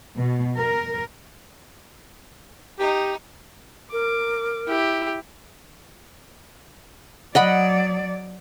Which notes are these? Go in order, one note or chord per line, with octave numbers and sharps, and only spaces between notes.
B2
A#4
D#4 G4
A#4 D6
E4 G4
F#3 D5 D#5 F#5 B5